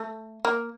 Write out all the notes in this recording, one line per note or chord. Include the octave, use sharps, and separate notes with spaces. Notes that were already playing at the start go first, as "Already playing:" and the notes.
Already playing: A3
A#3